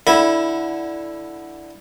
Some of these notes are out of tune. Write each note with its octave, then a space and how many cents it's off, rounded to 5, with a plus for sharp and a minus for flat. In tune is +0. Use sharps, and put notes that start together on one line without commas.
D3 +0 E4 +0 B5 -15